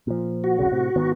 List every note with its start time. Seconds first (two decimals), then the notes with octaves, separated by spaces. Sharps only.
0.07 A#2 F3
0.44 F#4
0.59 E1 C2 C#3
0.72 A2 C3
0.96 G#1 D#3 B3